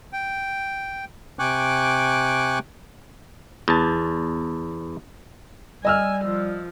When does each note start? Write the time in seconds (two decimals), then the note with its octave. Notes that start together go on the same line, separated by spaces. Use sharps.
0.13 G5
1.39 C3 G5 G#5 C#6 D6 F#6
3.68 E2 A5
5.85 G3 D#5 G#5 E6 F6
6.24 F3